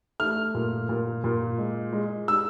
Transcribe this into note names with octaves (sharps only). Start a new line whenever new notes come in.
A3 F6
A#2
A#2
A#2
G#3
G#3
G#3 E6